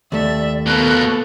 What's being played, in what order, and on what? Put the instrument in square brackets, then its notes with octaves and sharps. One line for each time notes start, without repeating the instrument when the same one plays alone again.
[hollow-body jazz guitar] D#2 A3 [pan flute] D5 [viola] E5
[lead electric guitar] B2 A#3 [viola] B3 A4 [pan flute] F#6